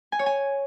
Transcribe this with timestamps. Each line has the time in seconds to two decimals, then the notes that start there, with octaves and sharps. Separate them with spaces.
0.12 G#5
0.19 C#5
0.26 G#5